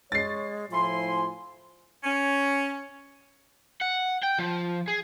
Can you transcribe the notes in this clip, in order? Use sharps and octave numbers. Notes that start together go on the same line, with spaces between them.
G#3 C#5 A6 C7
A2 F3 E4 G#5 C6
C#4
F#5
G5
F3
G#4